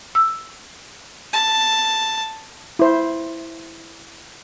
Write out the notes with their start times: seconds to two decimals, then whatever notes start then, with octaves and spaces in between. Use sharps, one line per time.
0.15 E6
1.33 A5
2.79 E4 C5